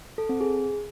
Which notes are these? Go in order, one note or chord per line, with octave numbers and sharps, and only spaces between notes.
A4
C4
G#4